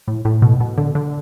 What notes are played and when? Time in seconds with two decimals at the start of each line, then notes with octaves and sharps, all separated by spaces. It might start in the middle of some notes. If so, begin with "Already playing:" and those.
0.07 A2
0.25 A2
0.42 B2
0.60 B2
0.78 D3
0.95 D3